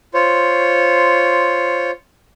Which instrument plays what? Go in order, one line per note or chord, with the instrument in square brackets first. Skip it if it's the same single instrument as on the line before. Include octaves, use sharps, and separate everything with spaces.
[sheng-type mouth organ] F4 C5 C#5